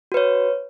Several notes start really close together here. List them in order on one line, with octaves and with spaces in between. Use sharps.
F#4 B4 C#5